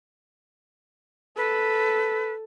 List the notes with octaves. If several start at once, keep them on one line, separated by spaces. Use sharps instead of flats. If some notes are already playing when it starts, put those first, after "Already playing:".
A4 B4